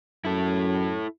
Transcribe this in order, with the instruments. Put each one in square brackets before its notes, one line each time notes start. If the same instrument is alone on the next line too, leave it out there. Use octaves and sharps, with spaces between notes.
[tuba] F#2 [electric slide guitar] E4 A4